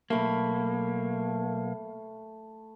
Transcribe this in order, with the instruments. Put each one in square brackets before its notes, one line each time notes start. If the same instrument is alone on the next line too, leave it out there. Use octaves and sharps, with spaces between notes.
[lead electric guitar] B1 A#3 [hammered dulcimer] A3 G5 B5